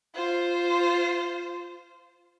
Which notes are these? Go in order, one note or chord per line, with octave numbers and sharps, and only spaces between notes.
F4 C5